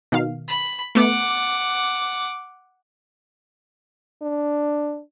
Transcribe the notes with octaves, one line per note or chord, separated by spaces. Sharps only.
B2 D#3 F5
B5
A3 B3 F#5 D6
D4